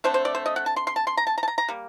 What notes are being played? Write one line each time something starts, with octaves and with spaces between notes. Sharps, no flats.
D3 A3 C4 C5
C5
D5
C5
D#5
F#5
A5
C6
C6
A5
C6
A#5
A5
A#5
A5
A#5
A#5
G3 A#3